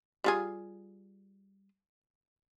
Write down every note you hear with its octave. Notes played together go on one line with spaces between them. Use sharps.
G3 F4 G#4